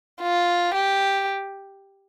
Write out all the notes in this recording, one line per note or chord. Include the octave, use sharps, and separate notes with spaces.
F4
G4